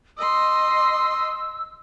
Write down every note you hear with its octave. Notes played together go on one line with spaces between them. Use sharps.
D#5 C6 E6